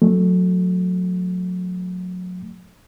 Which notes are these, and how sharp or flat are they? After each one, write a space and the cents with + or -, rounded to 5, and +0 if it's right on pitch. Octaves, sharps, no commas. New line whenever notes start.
F#3 -30 A3 +0